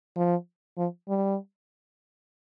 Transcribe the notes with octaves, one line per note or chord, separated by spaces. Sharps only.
F3
F3
G3